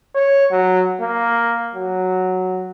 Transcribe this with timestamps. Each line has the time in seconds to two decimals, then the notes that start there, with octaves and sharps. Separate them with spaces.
0.15 C#5
0.51 F#3
1.00 A#3
1.75 F#3